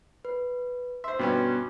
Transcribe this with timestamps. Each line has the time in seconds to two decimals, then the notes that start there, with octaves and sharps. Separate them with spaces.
0.25 B4
1.04 C5 E5 C6
1.19 G2 B2 B3 C#4